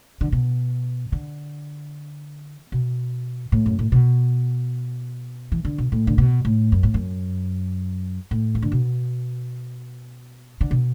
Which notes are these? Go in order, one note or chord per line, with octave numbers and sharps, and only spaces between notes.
D3
B2
D3
B2
A2
F#2
A2
B2
E3
D3
B2
A2
D3
B2
A2
F#2
A2
F#2
A2
E3
D3
B2
D3
B2